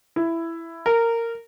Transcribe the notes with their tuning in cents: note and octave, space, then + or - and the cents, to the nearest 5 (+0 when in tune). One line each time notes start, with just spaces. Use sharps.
E4 +10
A#4 -15